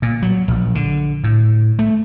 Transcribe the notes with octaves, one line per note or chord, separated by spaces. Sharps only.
A#2
F#3
A#1
D3
A2
A3